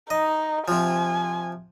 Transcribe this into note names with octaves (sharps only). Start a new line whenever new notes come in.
D#4 D#5
C3 F3 G#5